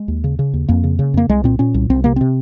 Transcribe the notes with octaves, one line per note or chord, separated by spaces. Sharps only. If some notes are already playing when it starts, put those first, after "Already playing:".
Already playing: G#3
D#2
C#3
C#3
D#2
F2 A#3
C#3
C#3
F2 A#3
C2 G#3
A#2 C4
A#2 C#4
C2
C2 C4
C3 A#3
C3 C4